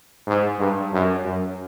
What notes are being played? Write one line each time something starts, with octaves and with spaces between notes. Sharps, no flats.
G#2
G2
F#2
F#2